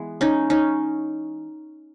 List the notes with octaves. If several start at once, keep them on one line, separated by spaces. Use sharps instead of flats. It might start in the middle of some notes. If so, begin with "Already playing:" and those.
Already playing: E3 G#3 B3
C#4 D#4
C#4 D#4